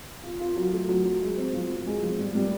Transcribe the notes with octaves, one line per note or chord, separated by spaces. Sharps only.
F4
F4
F#3
A3
F#3
F#3
G#3
C4
F3
F3
G#3
F3
G3
G3